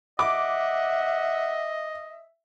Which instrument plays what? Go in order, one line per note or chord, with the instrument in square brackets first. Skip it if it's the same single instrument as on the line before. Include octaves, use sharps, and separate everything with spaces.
[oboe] D#5 [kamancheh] E5 [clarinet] F#5 [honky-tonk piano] D6